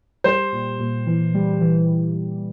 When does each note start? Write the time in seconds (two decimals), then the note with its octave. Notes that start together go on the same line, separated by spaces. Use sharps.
0.24 G3 C5
0.52 A#2
0.79 A#2
1.06 E3
1.34 G3
1.61 E3